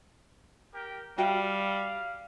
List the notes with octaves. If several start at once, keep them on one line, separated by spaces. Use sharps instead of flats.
G4 A#4 G5
G3 F#4 E5 F5 G5